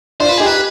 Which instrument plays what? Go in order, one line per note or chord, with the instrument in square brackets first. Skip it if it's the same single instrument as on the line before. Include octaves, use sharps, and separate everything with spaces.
[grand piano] D4 F4 [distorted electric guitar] C5
[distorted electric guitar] B4
[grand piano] D#4 G4 [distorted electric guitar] G#4
[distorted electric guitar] B4